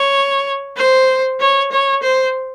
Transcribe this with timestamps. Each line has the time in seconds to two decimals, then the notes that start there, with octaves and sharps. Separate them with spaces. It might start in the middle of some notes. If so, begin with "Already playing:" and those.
Already playing: C#5
0.77 C5
1.40 C#5
1.71 C#5
2.03 C5